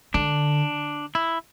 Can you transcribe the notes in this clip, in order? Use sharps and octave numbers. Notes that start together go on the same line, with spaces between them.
D3 D4
E4